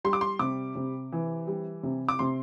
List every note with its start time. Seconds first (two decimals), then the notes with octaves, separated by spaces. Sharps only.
0.04 G3 C6
0.13 D6
0.21 C6
0.39 C3 D6
0.75 C3
1.12 E3
1.47 G3
1.83 C3
2.09 D6
2.19 C3 C6